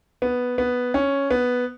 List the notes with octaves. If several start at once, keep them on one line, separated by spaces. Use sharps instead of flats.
B3
B3
C#4
B3